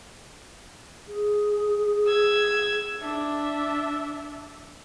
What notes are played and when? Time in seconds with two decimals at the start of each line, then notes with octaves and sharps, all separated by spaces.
1.08 G#4
2.07 E6 G#6
3.01 D4 E5